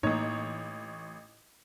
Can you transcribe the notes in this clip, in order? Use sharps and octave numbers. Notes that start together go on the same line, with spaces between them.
A1 A2 A#3 D#4 C#5